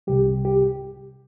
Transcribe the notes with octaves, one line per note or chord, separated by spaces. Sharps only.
C2 C3 G3 G4
G4